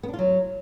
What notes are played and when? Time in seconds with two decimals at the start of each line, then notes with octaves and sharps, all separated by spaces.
0.03 B3
0.08 D4
0.14 F4
0.19 F#3